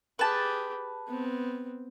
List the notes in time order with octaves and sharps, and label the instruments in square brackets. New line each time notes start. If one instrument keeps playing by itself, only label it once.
[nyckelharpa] G4 G#4 [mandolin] B4 A5
[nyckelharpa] B3 C4